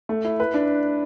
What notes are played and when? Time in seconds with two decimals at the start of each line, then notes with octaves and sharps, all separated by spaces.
0.09 A3
0.25 E4
0.40 B4
0.54 D4